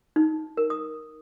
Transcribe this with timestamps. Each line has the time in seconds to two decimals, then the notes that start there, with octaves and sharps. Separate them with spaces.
0.16 D#4
0.57 A#4
0.70 D#6